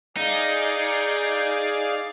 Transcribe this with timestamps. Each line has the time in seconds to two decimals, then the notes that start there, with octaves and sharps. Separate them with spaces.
0.17 D#4 G#4 D5 F5